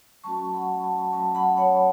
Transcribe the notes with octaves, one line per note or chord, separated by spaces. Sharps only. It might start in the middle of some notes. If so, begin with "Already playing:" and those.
F#3 A3 C#4 F#4 A5 C#6
F#5 B5
A5 C#6
F#3 A3 C#4 F#4 A5 C#6
F#5 B5
C#5 F#5